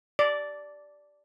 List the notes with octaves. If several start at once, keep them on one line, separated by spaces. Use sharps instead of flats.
D5